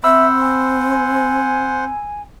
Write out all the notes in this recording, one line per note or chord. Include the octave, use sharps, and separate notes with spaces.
C4 C5 E5 F#5 B5 E6
G#5